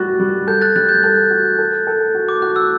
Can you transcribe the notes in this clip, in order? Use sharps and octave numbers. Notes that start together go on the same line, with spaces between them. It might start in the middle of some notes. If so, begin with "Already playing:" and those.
Already playing: G3 F#4 F#6 A6
G3
A4 G6
F#6 A6
G3 F#6 A6
G6
A4 F#6
F#4
A4
A4
F#4
D6
F#4 F#6
E6